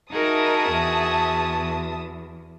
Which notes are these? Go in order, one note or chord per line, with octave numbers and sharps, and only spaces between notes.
D#4 F#4 G#4 A#4 E5 A5 D#6
E2